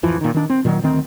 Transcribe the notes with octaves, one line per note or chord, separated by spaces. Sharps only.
D1 F2 E3 F3
A#2 D#3
D#3 D4
C4
A#2 D#3 F#3
D2 D#3 C4